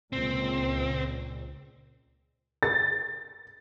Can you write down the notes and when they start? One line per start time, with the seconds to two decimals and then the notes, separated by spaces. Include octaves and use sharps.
0.13 C#2 A#2 C4
2.63 A6